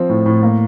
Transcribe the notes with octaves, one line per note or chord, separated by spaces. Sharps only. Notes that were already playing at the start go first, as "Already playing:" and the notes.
Already playing: F3 C4
A2
A2
A#3